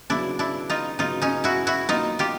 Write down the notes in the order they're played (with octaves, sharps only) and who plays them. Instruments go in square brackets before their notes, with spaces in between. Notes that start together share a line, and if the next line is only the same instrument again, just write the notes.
[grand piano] C#3 F#3 B3 [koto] D4 E4
[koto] D4 E4
D#4 F4
[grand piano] C#3 F#3 B3 [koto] D#4 F4
[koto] C#4 D#4
E4 F#4
E4 F#4
[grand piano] B2 F#3 A#3 [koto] D#4 F4
[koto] F4 G4